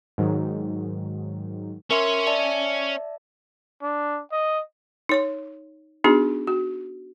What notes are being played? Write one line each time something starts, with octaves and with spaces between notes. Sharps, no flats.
G#2 D#3 F#3
C#4 A#4 C#5 E5 C6
D5 E5 A5
D4
D#5
D#4 C#5 C6
B3 D4 D#4 F#4 G#4
F#4